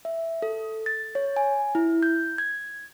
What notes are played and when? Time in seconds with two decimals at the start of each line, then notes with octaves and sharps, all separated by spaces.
0.05 E5
0.42 A4
0.86 A6
1.15 C#5
1.37 G#5
1.75 E4
2.03 G6
2.38 G#6